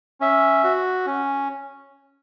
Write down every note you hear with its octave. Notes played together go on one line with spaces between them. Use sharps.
C#4 E5
F#4
C#4